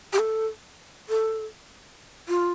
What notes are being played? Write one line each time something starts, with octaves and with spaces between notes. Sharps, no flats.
G4
A4
A4
F4